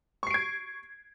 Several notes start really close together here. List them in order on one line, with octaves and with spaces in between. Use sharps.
C#6 C7 D7 G#6